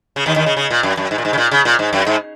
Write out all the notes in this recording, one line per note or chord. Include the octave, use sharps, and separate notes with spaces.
C#3
D#2 D#3
D#2 D#3
C#3
C#3
A#2
F#2
F#2
G#2
A#2
G#2
C#3
A#2
C#3
A#2
G#2
F#2
G#2